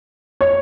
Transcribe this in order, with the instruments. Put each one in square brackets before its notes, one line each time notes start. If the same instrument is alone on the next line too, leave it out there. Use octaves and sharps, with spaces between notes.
[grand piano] C#5